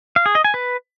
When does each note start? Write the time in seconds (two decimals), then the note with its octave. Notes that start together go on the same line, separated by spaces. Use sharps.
0.16 F5
0.26 G#4
0.35 D#5
0.45 G#5
0.54 B4